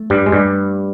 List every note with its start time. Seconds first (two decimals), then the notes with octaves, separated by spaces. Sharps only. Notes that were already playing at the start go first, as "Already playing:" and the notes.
Already playing: A3
0.10 G2 G3
0.26 G#3
0.32 G2 G3